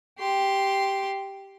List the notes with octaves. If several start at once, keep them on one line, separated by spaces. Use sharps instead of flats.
G4 C6